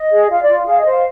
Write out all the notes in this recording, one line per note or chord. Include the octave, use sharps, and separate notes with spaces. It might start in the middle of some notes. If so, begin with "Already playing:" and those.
Already playing: D#5
G#4
F4 F5
D5
F4
G#4 F5
D#5
C5
F5